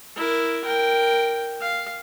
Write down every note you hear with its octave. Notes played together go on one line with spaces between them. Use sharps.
E4 A#4
A#4 G5
F5